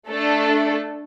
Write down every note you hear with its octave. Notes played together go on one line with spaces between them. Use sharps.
A3 D4 A4